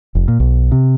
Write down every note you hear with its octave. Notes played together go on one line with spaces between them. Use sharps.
F1
A#2
B1
C3